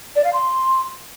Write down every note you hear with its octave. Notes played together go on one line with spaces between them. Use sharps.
D5
F5
C6